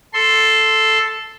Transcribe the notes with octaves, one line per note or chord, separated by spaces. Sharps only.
A4 C6